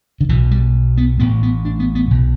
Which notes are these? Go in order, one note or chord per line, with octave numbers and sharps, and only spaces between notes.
D3
B1 B2 E3
G3
B3
A1 A2 B3
B3
D4
B3
B3
B1 B2